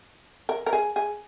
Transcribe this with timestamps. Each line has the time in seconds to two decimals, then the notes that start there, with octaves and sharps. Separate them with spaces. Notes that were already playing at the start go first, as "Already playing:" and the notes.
0.49 A#4
0.66 A#4
0.73 G#4
0.96 G#4